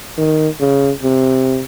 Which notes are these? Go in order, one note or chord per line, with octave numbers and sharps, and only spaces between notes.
D#3
C#3
C3